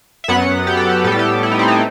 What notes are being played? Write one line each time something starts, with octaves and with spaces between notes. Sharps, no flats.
E5
F#2 F#3 B3 F#5
G4
A4
G4
A2 G3 B3 G4 A4
G4
E4
D#4
C4
D#4